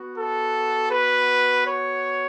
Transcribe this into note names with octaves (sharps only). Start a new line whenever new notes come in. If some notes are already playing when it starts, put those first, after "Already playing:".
Already playing: B3 F#4
A4
B4
C#5